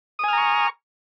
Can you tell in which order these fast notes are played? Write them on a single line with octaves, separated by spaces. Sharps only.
D#6 G#5 F6 A#5 C#6